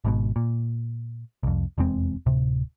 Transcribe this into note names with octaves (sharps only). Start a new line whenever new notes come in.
G#1 G#2 B2
A#2
C2 F2
F1 E2 G#3 C4
D1 C3